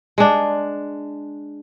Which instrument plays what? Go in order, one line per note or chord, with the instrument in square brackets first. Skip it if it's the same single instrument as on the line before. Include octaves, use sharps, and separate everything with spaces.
[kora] G#3 D4